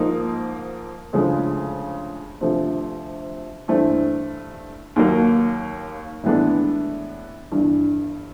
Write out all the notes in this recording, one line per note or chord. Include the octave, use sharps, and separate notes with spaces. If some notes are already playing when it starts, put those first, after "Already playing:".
Already playing: G#2 F3 A#3 D#4
D2 C#3 F3 G#3
D2 C3 F3
G2 E3 A3 C4
D#2 D#3 F#3 A#3
A2 E3 G#3 B3 D4
G1 G2 E3